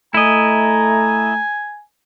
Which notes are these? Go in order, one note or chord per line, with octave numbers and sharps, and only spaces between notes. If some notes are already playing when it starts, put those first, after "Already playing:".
A3 E4 D#5 G#5 A#5